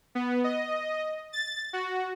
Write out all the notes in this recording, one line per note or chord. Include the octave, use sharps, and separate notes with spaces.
B3
D#5
A6
F#4